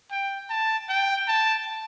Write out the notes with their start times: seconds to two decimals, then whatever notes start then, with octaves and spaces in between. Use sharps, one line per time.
0.11 G5
0.50 A5
0.89 G5
1.28 A5